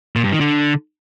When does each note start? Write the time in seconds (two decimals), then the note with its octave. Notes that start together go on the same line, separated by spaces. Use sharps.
0.16 A#2
0.24 G2
0.32 D#3
0.40 D3